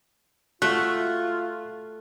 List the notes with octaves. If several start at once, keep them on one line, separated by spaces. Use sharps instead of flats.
A3 F4 F#4 E5 F#5 F#6